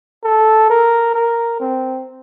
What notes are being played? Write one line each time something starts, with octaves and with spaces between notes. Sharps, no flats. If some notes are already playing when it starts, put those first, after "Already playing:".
A4
A#4
A#4
C4